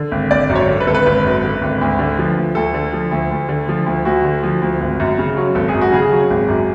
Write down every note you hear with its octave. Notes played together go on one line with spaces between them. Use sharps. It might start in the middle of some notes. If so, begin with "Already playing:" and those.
Already playing: D3
G#1
G#1 D5
F#2
C#5
D3
B4
G#1 A4
B4
G#1 B4
F#2
D3
G#1
D2
D3
F3
D2
D2 A4
D3
F3
D2
D2
D3
F3
D2
D2 F#4
D3
F3
D2
G#1
F#2
C#3
F#3
G#1 A4
G#4
F#2
F#4
C#3 G#4
F#3
G#1
F#2